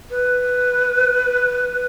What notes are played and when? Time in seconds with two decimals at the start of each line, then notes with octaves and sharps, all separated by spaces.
0.10 B4